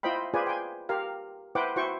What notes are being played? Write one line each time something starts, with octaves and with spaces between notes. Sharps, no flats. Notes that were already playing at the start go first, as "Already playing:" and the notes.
E4 F4 C5 D#5 G5 B5
F4 G#4 B4 C5 D5 G#5
G5 G#5
G4 A#4 F5
E4 B4 C5 F#5 G5 D6
E4 F#4 C5 G5 C#6